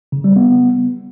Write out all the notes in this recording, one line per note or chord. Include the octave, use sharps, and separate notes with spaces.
C#3
G3
B3